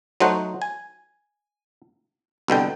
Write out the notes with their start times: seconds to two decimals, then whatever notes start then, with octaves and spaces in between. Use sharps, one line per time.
0.20 F#3 A3 D#4 C5 F#5
0.62 G#5
2.48 C2 B2 D3 G5